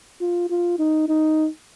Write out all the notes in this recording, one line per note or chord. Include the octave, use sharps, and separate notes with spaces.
F4
F4
D#4
D#4